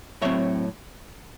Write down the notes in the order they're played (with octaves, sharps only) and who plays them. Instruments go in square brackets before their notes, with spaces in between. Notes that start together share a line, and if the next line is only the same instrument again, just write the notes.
[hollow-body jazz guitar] A2 F#3 C4 C#5 E5